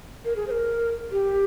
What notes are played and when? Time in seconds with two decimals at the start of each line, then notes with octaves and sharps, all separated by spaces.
0.25 A#4
0.36 G#4
0.47 C5
0.51 A#4
1.11 G4